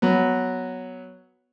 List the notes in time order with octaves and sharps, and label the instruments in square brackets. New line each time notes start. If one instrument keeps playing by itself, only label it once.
[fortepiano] F#3 B3